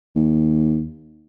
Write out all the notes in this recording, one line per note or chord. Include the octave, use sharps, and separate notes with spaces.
D#2